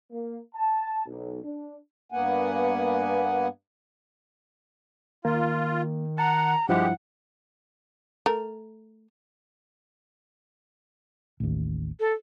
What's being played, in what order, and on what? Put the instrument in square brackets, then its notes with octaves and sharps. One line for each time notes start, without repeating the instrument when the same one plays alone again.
[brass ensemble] A#3
A5
B1
D4
[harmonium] G2 A#3 B3 F#5 G#5
[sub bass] D#3 [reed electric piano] A#3 [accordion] F4
[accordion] F#5 [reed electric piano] A5 [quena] A#5
[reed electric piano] G2 F3 E4 [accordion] G#3 G4 [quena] F#5
[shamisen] A3 A#4
[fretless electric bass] A1 D#2
[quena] A4